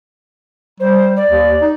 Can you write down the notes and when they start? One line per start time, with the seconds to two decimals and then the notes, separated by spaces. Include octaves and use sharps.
0.80 G3 C5
1.16 D5
1.30 D#2
1.62 D#4